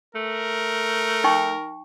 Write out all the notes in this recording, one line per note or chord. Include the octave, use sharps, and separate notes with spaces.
A3 A#4
D#4 G5 C#6